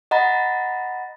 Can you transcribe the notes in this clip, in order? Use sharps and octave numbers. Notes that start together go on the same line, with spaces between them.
D#5 F#5 A#5 B5 A6